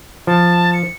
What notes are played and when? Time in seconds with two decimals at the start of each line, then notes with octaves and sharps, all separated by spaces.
0.27 F3 A5
0.74 C#7